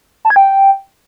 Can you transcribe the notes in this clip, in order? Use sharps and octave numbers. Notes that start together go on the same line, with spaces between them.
A5
G#6
G5